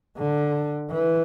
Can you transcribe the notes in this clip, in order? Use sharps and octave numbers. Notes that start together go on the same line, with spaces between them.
D3
E3